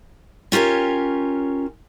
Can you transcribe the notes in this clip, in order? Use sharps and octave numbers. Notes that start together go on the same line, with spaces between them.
C#4 F4 G4 A#4 C#5